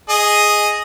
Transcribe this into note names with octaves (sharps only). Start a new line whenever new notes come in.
G#4 D#5